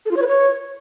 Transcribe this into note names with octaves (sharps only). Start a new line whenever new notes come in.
A4
F4
C#5
B4
C#5